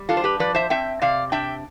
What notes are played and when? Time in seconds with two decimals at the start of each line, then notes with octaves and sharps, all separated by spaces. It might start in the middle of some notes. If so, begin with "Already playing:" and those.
Already playing: G3
0.09 D4 F4 A4
0.17 C5
0.24 G4 B4
0.39 F3 B4 D5
0.55 C5 E5
0.70 C4 E5 G5
1.02 C3 D5 F5
1.32 D4 E5 G5